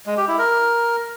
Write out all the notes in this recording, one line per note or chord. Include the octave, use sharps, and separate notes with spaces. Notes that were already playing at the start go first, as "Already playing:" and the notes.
G#3
G4
E4
A#4